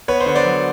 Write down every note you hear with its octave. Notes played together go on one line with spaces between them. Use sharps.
B3 B4 C#5
C5
D3 C#5
C5 D5
F#3